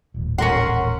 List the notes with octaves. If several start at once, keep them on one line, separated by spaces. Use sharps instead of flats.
D#1 A1
C#4 A#4 F#5 C6